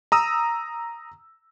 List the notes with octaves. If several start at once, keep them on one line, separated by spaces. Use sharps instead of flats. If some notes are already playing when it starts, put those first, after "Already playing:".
A#5 D#6 E6